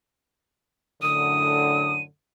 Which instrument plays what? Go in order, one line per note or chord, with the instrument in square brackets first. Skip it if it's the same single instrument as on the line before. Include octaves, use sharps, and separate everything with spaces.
[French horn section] F#2 A2 D3 [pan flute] D#6 [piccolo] D#7